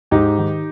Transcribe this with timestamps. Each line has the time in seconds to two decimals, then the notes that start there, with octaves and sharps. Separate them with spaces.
0.11 G#2 D#4 G4
0.38 D#3